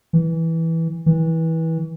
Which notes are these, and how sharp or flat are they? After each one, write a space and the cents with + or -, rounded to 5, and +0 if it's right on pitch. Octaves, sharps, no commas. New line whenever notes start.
E3 -10
E3 -25